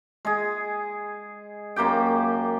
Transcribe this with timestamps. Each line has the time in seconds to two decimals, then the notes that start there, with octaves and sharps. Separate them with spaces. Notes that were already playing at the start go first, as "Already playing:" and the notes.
0.25 G#3 G#4
1.76 F#2 A#3 G4 G5